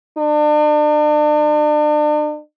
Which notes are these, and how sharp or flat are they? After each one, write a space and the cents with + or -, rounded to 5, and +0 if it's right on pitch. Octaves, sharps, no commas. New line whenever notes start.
D4 +40